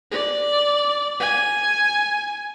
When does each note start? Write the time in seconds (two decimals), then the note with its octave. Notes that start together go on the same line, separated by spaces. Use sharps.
0.11 D5
1.20 G#5